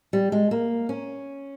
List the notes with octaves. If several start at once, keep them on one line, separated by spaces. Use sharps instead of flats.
G3
G#3
A#3
C#4